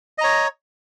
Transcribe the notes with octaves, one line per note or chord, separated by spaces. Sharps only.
C#5 D#5 A#5